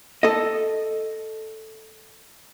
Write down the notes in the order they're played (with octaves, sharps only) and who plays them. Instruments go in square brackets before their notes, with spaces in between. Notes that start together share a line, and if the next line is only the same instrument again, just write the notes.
[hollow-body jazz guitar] A4 D#5